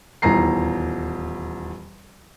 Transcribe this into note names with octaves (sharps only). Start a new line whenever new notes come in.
D#1 E2 A#5 C7